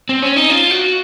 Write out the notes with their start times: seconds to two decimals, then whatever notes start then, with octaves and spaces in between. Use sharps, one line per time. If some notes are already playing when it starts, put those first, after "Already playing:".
0.09 C4
0.22 C#4
0.37 D#4
0.50 F4
0.71 F#4